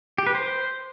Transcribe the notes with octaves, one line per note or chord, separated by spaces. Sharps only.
G4
B4
C5